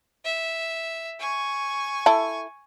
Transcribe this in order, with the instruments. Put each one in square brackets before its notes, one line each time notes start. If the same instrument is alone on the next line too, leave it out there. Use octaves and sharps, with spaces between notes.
[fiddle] E5
G#5 C#6
[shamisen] E4 A4